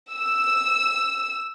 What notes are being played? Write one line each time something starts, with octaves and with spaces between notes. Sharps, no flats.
E6